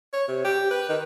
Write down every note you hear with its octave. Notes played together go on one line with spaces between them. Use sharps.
C#5
C3
G4
B4
D#3